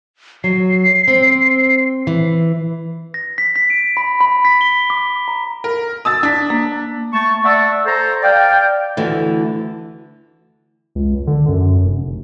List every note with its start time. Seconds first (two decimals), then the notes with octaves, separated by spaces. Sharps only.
0.44 F#3 C7
1.08 C4
2.07 E3
3.14 A#6
3.38 B6
3.56 B6
3.70 D7
3.97 B5
4.21 B5
4.45 B6
4.61 G7
4.90 D6
5.28 A#5
5.64 A#4
6.05 D#6 E6 A6
6.23 D4 B6
6.50 A#3
7.13 A3 A5 C#6
7.44 D5 E5 F#5 A5 C#6 E6
7.86 A4 C5 A#5
8.22 D5 F5 G5
8.97 D2 D3 E3
10.95 C#2
11.27 D3
11.48 F#2
11.84 F1